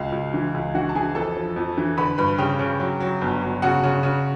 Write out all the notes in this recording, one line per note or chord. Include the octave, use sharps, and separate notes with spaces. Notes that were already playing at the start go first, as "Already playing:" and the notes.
Already playing: C#2 F4 F5
C#2
E3
C#2
E3 F#4 F#5
A5
E3 G#4 G#5
F2 A4 A5
F3
F2
E3
D3 B4 B5
G2 B4 B5
C#3 G4 G5
C#3
F#3
F#3
G1
G1
C#3 F#4 F#5
C#3
C#3